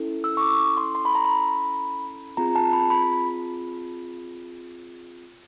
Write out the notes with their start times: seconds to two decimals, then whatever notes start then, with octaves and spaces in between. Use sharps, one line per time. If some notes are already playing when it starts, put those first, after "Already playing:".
Already playing: C#4 E4 A4
0.24 E6
0.37 C#6
0.42 D6
0.77 C6
0.95 C6
1.05 B5
1.15 A#5
1.25 B5
2.37 C4 F4 G#4 A#5
2.56 A5
2.73 B5
2.90 B5